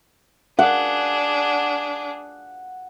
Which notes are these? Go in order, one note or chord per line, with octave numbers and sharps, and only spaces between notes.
D4 G#4 F#5